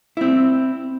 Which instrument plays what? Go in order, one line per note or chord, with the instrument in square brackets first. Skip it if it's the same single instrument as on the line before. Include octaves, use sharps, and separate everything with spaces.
[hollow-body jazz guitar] C4 E4